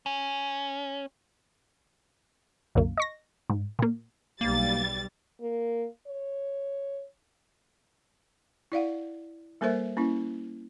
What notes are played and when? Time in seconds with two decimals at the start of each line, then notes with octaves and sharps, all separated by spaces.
0.06 C#4
2.75 C2 F#2 D3 A#3
2.97 D#5 C#6 A#6
3.50 G#2
3.79 A#2 A#3
4.41 B1 G3 A#3 A6
5.41 A#3
6.07 C#5
8.72 E4 D5 F5 F#5
9.61 G3 A#3 A4 A#4 C5 E5
9.97 A#3 C#4 E4